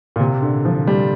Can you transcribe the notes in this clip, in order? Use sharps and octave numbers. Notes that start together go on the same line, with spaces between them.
A#2
C3
D3
F3
G3